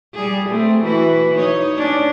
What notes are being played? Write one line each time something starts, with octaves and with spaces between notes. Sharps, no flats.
G3 G#4
A3 C4
E3 F#4 B4
D#4 C#5 D#5
C#4 D4